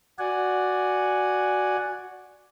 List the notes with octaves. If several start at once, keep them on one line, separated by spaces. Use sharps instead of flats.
F#4 D5 F#5 G#5